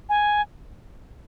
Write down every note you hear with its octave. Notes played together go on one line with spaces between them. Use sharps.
G#5